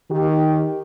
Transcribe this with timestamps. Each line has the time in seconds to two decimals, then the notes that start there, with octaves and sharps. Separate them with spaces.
0.10 D#3 G4